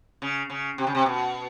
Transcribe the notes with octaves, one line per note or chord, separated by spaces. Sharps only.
C#3
C#3
C3
C#3
C3
B2